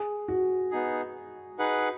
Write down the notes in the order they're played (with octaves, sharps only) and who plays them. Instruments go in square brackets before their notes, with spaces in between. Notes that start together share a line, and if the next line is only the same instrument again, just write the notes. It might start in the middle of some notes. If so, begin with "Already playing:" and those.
Already playing: [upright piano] G#4
F#4
[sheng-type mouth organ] B3 D#4 G#4
D#4 G#4 B4 F#5